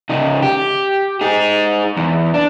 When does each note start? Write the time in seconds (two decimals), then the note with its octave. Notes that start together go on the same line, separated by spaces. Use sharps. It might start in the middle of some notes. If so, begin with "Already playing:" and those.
0.09 C#3 D#4
0.42 G4
1.21 D#4 G#4
1.97 E2
2.34 D4